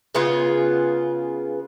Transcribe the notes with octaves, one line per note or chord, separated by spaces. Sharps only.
C#3 B3 F4 G#4